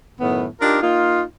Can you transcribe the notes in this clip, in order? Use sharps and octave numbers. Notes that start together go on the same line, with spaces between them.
F#2 A2 D#3 B3
D4 D#4 F4 G4 A#4
A#3 D#4 F4